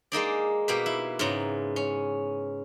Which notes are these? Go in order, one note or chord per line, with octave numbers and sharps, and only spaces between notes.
G#3 A#3 D#4 D5
B2 A#3 G4 B4
E4
G#2 C#3 B3 A#5
C#4